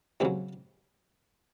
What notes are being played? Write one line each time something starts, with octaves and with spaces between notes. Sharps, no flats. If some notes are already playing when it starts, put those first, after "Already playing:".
D#2 C#3 F#3 G#3 C4